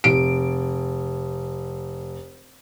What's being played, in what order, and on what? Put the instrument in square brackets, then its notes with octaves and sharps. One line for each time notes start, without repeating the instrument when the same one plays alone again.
[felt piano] F1 D7